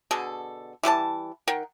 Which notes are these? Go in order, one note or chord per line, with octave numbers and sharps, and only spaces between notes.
B2 D3 G#4 A4
E3 G3 B4 A5
D#3 A#4 F#5 G5